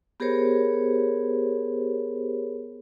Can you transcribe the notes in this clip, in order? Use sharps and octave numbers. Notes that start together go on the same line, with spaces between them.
B3 G4 G#4 A#4 C5 C#5